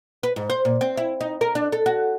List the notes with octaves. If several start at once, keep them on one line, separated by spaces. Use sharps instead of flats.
B4
G#2
C5
A#2
C4
E4
D#4
A#4
D4
A4
F#4